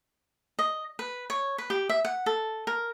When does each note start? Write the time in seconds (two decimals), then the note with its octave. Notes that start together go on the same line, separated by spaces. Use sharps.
0.59 D#5
0.99 B4
1.30 C#5
1.58 B4
1.70 G4
1.89 E5
2.05 F#5
2.26 A4
2.67 A#4